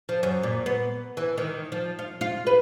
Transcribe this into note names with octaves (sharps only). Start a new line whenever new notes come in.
F3
F#2
A#2
B3
E3
D#3
F3
F4
F4
B4